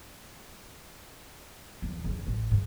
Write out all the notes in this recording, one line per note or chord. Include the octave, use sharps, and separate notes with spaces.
E2
E2 D3
A1
G#2